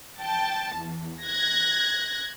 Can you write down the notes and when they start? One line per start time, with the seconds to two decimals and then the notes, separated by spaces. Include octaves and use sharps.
0.20 G5 A5
0.74 E2
1.24 F#6 G#6 A#6